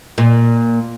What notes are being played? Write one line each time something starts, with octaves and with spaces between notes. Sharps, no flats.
A#2